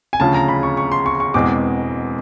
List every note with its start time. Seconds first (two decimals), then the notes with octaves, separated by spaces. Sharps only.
0.13 G#5
0.20 D2 C#3 F3 A5
0.34 A#5
0.48 B5
0.63 C#6
0.77 C#6
0.92 C6
1.06 C#6
1.20 C#6
1.34 E1 E2 B2 G#3 C4 D6